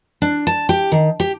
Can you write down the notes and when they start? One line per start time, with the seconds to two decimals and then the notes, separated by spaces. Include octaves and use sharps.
0.22 D4
0.47 A5
0.69 G4
0.92 D#3
1.20 G4